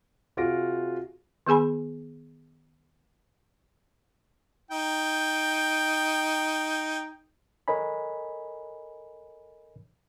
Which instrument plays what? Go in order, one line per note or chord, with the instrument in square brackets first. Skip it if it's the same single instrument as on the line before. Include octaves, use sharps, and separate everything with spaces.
[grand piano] C3 F4 F#4 G#4 A#6 D7
[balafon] D#3 B3 G#4 G#5 B5
[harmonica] D#4 G5
[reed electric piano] A4 A#4 C#5 D#5 G#5 B5